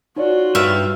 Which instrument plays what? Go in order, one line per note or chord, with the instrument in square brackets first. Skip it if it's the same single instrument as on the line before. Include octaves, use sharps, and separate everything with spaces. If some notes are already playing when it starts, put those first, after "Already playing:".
[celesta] D#4 C#5 D5 [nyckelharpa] F4 F#4
[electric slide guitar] G2 B4 [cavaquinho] E5 F5